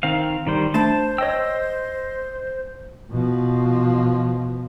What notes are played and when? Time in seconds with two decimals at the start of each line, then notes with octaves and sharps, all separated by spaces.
0.03 D#3 C4 F5
0.47 D#3 G3 C5
0.74 A3 D4 C5 A5 B5
1.18 C#5 D#5 G5 E6
3.12 B2 F3